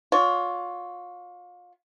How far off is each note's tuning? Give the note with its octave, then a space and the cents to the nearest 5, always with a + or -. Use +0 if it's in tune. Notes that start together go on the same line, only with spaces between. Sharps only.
F4 +30 C#5 +35